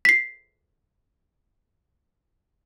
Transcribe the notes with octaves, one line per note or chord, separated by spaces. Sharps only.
B6 C7